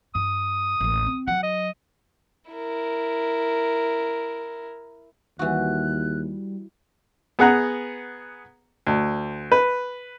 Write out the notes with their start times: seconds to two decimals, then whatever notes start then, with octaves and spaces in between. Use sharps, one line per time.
0.15 G2 D#6
0.81 A1 D#2
1.06 C4
1.28 F#3 F#5
1.43 D#5
2.52 E4 A#4
5.39 D#2 E3 G3 F#4 F#6
7.39 B3 G#4 F#5 A#5
8.87 D2
9.52 B4